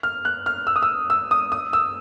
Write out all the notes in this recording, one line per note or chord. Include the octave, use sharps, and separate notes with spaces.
F6
F#6
F6
E6
D#6
E6
E6
D#6
D#6
E6